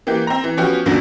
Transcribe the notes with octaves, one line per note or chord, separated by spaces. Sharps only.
E3 A#3 G4
C4 A#5
E3
F3 B3 C#4 F#4 G4
G1 D2 A#2 D3 F#3